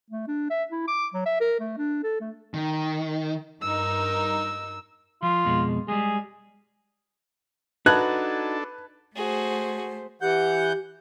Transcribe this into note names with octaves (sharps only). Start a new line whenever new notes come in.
A3
D4
E5
E4
D6
F#3
E5
A#4
A3
D4
A4
A3
D#3
G2 D#4 A#4 E6
F3 F4
F2 B2 G#3
G3 G#3 G#4
D4 D#4 F#4 A4 B4 A5 F#6 G#6
A3 F#4 G#4 C5
E3 G4 F#5 G6